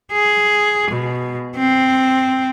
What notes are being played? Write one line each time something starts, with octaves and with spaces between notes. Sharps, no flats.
G#4
B2
C4